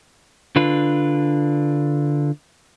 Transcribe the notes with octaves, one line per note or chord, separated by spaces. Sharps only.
D3 D4 F4 B4